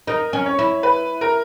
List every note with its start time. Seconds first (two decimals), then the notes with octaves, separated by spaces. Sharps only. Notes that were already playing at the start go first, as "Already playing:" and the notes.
0.07 D#4 A#4
0.33 C#4
0.46 C#5
0.59 E4
0.83 B4
1.21 A#4